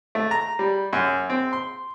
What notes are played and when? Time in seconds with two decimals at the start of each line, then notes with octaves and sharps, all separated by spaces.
0.15 A3
0.31 A#5
0.59 G3
0.93 F#2
1.30 C4
1.53 C6